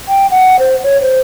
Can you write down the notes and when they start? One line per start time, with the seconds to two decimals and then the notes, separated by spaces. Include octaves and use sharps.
0.08 G5
0.31 F#5
0.59 C5
0.83 C#5
1.01 C5